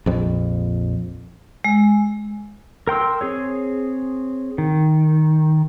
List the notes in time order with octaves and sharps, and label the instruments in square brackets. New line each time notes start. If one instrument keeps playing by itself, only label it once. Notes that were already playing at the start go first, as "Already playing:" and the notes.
[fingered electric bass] A#1 F2
[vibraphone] G#3
[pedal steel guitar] A#4 G5 C6 E6
C4 G#4 C#5
D#3